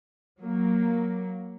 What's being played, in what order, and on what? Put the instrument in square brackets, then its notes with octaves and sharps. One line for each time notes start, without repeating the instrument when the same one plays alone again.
[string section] F#3 A#3